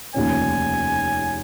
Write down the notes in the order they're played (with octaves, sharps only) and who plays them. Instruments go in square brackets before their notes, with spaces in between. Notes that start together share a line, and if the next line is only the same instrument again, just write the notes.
[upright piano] F1 D#2 C#3 F3 C#4 [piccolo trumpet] G#5